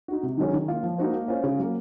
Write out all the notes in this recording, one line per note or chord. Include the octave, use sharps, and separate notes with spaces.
D#4 F#4
C3
D#3 F#3 C#4 G#4
D#3
A#3 F4
F3
A#3 D#4 F#4 C5
A#3
C#4 F4 C5
C#3
F#3 A#3